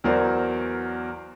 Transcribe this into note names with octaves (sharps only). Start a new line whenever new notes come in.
E2 F#3 A#4 C5 D5